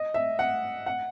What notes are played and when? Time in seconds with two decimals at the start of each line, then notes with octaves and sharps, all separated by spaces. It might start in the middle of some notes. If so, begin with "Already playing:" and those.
Already playing: D#5
0.14 E5
0.39 F#5
0.86 F#5